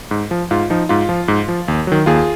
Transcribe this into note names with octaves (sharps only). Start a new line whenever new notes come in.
G#2
F3
G#2 F4
F3 D#4
G#2 F4
F3
G#2
F3
D#2
D#3 F#3
D#2 F4 G#4